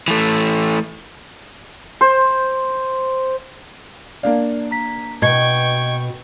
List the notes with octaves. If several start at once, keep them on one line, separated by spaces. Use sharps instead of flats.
E3 A3
C5
A#3 D4 D5 F5
A#5 B6
B2 D#5 G5 C#6 G#6